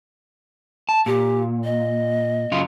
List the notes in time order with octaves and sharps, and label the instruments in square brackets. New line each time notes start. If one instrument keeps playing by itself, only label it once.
[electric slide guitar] A5
[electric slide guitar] A#2 [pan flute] G4
[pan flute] D#5
[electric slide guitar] F#2 C#3 F4